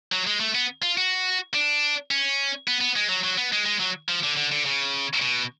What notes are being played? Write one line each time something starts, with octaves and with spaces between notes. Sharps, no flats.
F#3
G#3
A3
B3
F4
F#4
D4
C#4
B3
B3
G#3
F#3
F#3
B3
G#3
G#3
F#3
F3
D3
D3
D3
C#3
B2